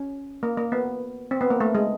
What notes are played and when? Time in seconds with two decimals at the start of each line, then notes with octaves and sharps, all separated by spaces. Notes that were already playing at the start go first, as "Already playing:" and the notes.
Already playing: C#4
0.43 A#3
0.58 A#3
0.72 B3
1.31 C4
1.41 B3
1.50 A#3
1.60 A3
1.75 G#3